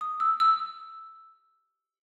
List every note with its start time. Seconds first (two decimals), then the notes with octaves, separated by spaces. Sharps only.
0.01 D#6
0.20 E6
0.40 E6